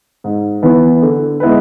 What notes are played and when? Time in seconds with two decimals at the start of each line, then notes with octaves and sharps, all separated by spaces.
0.24 G#2
0.62 E3 B3 E4 B4
1.02 D3
1.40 G#3 B3 E4 B4